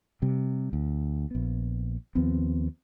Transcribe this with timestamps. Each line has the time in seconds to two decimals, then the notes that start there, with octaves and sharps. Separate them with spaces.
0.22 C3 G3
0.73 D2
1.31 A#1 B3
2.15 D#2 F3 B3 C4